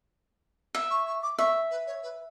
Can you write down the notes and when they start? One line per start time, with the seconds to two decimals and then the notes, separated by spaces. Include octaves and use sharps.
0.75 E5
0.90 C#6
1.07 C#6
1.23 D6
1.38 E5 C#6
1.71 B4
1.87 C#5
2.03 B4